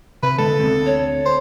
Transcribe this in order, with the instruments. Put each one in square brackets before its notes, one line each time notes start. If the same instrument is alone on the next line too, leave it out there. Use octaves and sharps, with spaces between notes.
[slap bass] C3 [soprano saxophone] B4
[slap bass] D3 G#3 B3 [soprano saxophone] A4
[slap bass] D2 C4
[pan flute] C#5
[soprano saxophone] C5